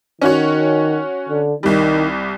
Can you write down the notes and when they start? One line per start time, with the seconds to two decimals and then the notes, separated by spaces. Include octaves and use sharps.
0.22 D#3 C#4 F#4 C#5
1.29 D3
1.63 C2 D#3 G3